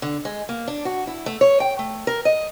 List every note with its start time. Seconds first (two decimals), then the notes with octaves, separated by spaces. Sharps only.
0.02 D3
0.25 G#3
0.49 A#3
0.68 D4
0.85 F#4
1.07 E4
1.26 A3
1.41 C#5
1.60 G5
1.79 A3
2.07 A#4
2.25 D#5